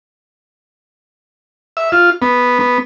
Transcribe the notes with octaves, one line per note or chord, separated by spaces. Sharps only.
E5
F4
B3
B3